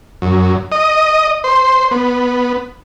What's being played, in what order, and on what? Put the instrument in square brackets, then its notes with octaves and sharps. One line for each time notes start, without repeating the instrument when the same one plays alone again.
[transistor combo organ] F#2
D#5
C5
B3